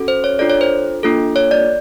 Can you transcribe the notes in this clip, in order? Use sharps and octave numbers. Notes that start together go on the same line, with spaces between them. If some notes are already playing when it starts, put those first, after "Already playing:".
Already playing: C#4 F#4 A4
C5
C#5
D4 F4 A4 D5
C#5
C5
A#3 D4 F4 A4
C#5
D5